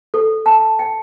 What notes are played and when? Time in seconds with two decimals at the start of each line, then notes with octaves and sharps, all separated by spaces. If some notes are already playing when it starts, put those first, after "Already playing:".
0.14 A4
0.46 A5
0.79 G5